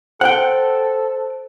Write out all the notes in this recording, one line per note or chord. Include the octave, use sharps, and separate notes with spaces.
A4 C5 F#5 G5